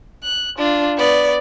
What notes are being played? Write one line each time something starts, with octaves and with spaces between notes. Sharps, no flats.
F#6
D4 F4
B3 D5